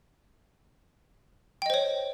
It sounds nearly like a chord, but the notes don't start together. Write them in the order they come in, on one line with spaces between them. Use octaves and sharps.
G5 D#5 C5 C#5